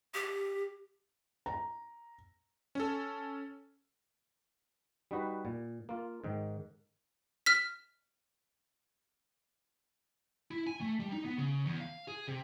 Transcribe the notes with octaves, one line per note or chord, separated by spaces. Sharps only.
G4
A#5
C#4 A4
G3 D#4 F#4 B4
A#2
A#3 F4
G#2 D#3
F6 B6
E4
G#5
A3
G3
D#4
B3
C#3
E2
F5
G#4
C3